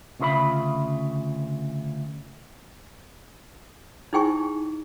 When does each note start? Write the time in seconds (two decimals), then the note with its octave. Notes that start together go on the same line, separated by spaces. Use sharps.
0.19 D2 C#3 F4 C5 E5 B5
4.13 D#4 E4 G#4 G5 G#5 C#6